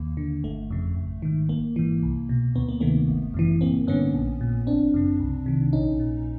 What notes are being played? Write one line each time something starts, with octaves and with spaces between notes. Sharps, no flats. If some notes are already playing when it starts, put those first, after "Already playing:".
Already playing: D#2 A#3
D3
G1 A3
F2 C#3
G#1
G#2 D#3
G#1 A#3
G#2 E3
C2
B2
D2 B3
A#3
C3 D#3 A3 B3
G1
F#2 C#3 E3
A1 A#3 C4
G2 D3 B3 C#4
A#1
A#2
G1 C4 D4
F#2 C#3
C2
C3 D#3
A#1 C#4 D#4
A#2